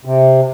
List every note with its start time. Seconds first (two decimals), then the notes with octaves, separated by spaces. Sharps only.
0.05 C3